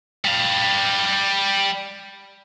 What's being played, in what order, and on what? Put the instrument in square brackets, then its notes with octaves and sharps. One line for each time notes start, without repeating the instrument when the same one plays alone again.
[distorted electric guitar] G3 F5